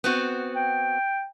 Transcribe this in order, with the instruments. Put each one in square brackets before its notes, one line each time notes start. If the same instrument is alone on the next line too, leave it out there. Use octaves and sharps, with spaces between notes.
[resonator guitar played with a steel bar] B3 C4 F#4
[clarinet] G5